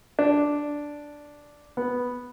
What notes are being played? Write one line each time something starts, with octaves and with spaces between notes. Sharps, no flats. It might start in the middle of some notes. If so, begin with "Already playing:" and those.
D4
B3